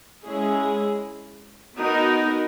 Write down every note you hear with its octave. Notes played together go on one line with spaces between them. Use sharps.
G#3 C#4 E4 G#4
B3 D#4 F#4 A#4